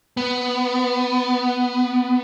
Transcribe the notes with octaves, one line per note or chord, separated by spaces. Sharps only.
B3